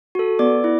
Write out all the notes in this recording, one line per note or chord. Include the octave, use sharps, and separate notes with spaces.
F#4 A4
B3 D5 D6
E4